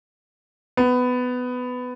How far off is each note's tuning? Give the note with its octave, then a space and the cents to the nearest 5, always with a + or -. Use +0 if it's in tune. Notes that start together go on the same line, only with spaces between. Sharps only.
B3 +15